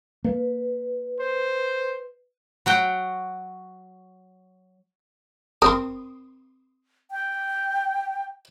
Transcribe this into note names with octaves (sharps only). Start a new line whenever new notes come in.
A#3 B4
C5
F#3 F#4 G5
C4 A#4 C6 D#6
G5